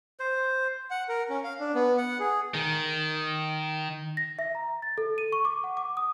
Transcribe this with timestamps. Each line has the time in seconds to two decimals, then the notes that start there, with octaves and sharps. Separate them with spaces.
0.20 C5
0.91 F#5
1.09 A#4
1.30 C#4
1.44 F5
1.60 D4
1.75 B3
1.98 F#5
2.20 G#4
2.54 D#3
4.17 A#6
4.39 E5
4.55 A#5
4.82 A6
4.98 A4
5.18 D#7
5.32 C#6
5.45 D6
5.64 F#5
5.77 D6
5.97 D#6